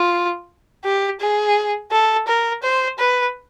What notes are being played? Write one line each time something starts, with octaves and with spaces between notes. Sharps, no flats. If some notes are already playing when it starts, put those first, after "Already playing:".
Already playing: F4
G4
G#4
A4
A#4
C5
B4